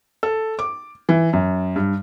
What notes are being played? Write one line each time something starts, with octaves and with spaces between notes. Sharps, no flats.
A4
D6
E3
F#2
G2